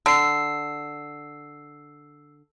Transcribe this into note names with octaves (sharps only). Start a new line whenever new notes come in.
D3 E6 C7